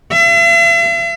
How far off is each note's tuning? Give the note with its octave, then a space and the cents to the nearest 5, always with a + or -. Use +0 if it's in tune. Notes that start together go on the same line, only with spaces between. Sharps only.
E5 +45